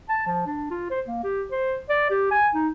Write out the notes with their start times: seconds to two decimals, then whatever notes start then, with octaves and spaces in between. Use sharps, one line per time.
0.09 A5
0.27 F3
0.46 D4
0.70 F4
0.90 C5
1.06 A#3
1.24 G4
1.52 C5
1.89 D5
2.10 G4
2.31 G#5
2.54 D#4